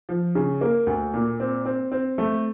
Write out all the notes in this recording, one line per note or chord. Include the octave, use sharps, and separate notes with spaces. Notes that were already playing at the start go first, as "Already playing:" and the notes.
F3
C#3
A#3
D2
A#2
C4
C4
C4
A3